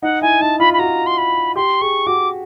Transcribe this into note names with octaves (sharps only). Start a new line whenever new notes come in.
D#4 F#5
E4 G#5
D#4 A5
F4 B5
B5
F#4 A#5
C6
B5
G4 C6
G#4 C#6
F#4 D6